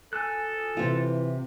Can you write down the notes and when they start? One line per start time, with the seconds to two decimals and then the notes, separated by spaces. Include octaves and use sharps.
0.13 A4 G#5 E6 F#6
0.77 C3 E3 F4